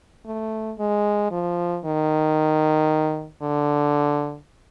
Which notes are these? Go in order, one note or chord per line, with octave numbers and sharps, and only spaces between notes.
A3
G#3
F3
D#3
D3